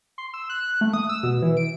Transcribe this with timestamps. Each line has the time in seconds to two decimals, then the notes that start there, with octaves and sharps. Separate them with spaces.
0.18 C6
0.34 E6
0.50 F#6
0.81 A3
0.93 D#6
1.09 E6
1.23 B2
1.42 E3
1.57 D7